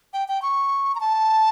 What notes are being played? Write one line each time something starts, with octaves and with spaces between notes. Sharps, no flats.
G5
G5
C#6
A#5
A5